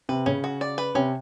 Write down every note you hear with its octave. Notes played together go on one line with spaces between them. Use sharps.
C3 B4
C#3 C#4
F#4
D5
B4
C3 C#4